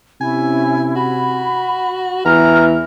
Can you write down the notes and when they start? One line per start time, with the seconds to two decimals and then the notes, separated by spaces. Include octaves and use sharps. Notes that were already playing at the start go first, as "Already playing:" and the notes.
0.21 C3 C#4 E4 G#5
0.96 F#4 B5
2.25 E2 E3 A#5 F6